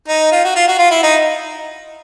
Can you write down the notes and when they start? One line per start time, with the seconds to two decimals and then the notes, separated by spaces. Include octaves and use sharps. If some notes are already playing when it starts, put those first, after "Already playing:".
0.08 D#4
0.32 F4
0.44 F#4
0.56 F4
0.68 F#4
0.79 F4
0.91 E4
1.03 D#4